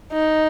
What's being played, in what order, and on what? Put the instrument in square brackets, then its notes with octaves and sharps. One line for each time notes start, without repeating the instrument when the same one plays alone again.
[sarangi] D#4